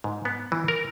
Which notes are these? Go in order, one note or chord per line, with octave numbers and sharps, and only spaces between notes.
G#2
B3
E3
A#4